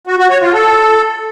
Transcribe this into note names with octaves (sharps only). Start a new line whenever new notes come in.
F#4
F#4
C#5
F4
A4